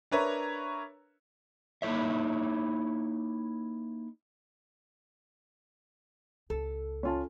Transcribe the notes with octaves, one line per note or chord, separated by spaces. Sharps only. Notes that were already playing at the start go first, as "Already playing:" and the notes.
D4 A#4 B4 C#5 E5 A#5
A#3 D#4 E4 C#5 E5
C#2 A4
C#4 F4 A5